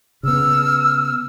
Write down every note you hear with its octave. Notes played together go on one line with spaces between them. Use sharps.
C#3 B3 E6 F6